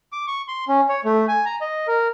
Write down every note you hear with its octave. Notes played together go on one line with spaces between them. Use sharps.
D6
C#6
C6
C#4
C#5
A3
G#5
A#5
D#5
A#4